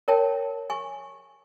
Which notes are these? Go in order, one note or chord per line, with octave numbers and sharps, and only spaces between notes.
A#4 C#5 G5 A5
G#5 C#6